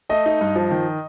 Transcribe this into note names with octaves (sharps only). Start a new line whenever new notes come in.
A3 D#5
D#4
G2
F3
D#3